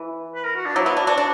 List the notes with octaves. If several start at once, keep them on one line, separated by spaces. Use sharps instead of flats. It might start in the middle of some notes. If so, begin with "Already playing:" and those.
Already playing: E3
B4
A#4
F#4
D4
F#3 E4
B3
D4 F#4
D4
D4